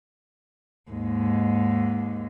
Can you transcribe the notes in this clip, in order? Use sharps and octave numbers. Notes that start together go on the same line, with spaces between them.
D#2 G#2